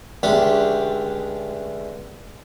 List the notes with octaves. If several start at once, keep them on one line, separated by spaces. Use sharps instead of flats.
C#2 D3 A3 D4 G4